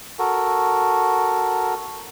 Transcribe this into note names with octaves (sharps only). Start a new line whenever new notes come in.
F#4 A4 A#4